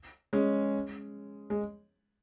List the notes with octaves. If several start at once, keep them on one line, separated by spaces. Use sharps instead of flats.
G#3 C#4
G#3